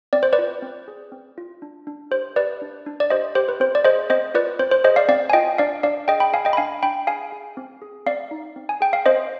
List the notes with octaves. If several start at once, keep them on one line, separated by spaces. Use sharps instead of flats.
C4 D5
C5
B4 D5
F4
C4
G#4
C4
F4
D4
D4
G4 C5
G4 B4 D5
D4
D4
D5
G4 C5 D#5
G4 C5
B4
C4 C5
D5
G#4 C5 D#5
C4 C5 D#5
F4 B4 D5
C4 C5
C5
G#4 C5 D#5
D5 F5
C4 D5 F5
G#5
F4 D#5 G5
D4 D5 F5
D4 D5 F5
G#4 D#5 G5
G5 B5
G#4 F5 G#5
D#5 G5
B5
D4 F5 G#5
D4 G5 B5
G#4 F5 G#5
G#4
C4
G#4
C4 D5 F5
D#4
C4
G#5
G#4 G5
F5
C4 C5 D#5